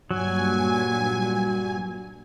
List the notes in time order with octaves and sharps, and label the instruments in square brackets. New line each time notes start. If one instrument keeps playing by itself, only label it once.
[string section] G2 A#2 G#5 [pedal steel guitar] F#3